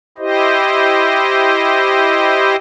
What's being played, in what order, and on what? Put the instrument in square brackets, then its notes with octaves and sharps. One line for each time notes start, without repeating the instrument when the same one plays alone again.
[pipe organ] E4 G4 C5 D#5